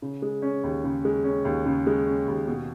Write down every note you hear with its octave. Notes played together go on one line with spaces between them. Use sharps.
C#3
G#3
C#4
D#2
C#3
G#3
C#4
D#2
C#3
G#3
C#4
D#2
B2